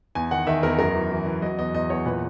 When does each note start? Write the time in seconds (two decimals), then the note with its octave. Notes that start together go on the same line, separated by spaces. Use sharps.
0.15 E2 G#5
0.31 D#3 F#5
0.47 D#3 E5
0.63 E2 A#4
0.79 F#2 A#4
0.95 E3
1.11 E3
1.26 E3
1.42 F#3 D#5
1.58 E2 D#5
1.74 E2 D#5
1.90 E2 C#5
2.05 A#2 B4